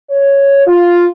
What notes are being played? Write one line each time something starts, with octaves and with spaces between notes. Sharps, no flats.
C#5
F4